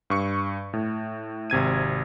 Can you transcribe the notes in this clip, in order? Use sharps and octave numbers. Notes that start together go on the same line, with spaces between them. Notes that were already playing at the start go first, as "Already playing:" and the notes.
G2 C#6 C#7
A2
G#1 C3 G#6 D#7